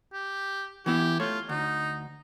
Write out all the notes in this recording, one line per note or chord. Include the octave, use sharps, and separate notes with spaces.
G4
E3 B3 E4 G4
A3 F4 C#5
D2 D#4